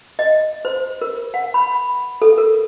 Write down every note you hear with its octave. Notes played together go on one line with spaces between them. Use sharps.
D#5
C5
A#4
F#5
B5
A4
A#4